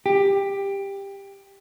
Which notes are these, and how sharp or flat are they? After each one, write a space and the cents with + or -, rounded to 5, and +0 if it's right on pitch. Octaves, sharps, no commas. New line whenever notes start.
G4 +15